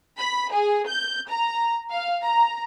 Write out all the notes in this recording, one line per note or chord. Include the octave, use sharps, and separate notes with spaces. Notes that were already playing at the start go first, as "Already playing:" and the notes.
B5
G#4
G6
A#5
F5
A#5